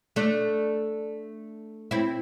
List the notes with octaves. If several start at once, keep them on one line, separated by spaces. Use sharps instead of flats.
A3 D4
C4 E4